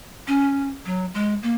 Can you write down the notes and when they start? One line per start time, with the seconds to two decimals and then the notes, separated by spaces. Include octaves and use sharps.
0.28 C#4
0.85 F#3
1.14 G#3
1.43 A#3